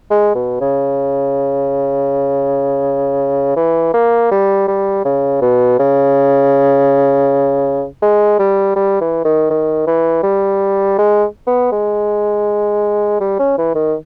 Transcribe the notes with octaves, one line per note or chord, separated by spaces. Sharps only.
G#3
B2
C#3
E3
A#3
G3
G3
C#3
B2
C#3
G#3
G3
G3
E3
D#3
D#3
E3
G3
G#3
B3
G#3
G3
C#4
E3
D#3